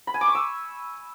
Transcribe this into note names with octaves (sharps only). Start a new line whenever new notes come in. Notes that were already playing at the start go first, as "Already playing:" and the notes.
B5
G#5
D6
C#6
E6